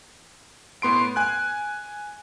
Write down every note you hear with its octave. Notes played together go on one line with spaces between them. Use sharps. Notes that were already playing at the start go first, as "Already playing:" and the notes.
A2 B3 C6 D7
G#5 F#6